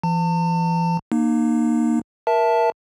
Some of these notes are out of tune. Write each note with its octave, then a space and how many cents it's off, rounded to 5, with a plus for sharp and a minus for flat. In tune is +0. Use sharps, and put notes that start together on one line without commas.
E3 +40 A5 +40
A#3 +10 D#4 -30
A#4 +20 E5 +0 A5 +0